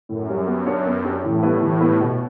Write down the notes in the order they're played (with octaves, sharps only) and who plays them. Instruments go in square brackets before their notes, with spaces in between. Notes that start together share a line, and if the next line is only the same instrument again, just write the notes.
[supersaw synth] F#2 [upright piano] A2
[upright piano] G3 C#4 G4 C#5
B3
D4 G4 C#5
B3
D4 G4 C#5
[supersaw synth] A2 [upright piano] E3
[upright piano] G3 B3 E4 B4
[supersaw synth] A2 [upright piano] E3
[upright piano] G3 B3 E4 B4
B2